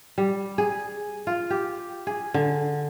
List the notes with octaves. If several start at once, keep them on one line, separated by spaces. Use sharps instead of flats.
G3
G#4
F4
G4
G#4
D3